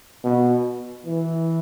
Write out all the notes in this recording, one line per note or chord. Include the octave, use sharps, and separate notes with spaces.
B2
E3